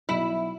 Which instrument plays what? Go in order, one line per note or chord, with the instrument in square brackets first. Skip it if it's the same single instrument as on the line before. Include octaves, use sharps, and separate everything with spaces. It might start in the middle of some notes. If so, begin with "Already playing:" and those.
[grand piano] B1 B2 F#3 [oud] E4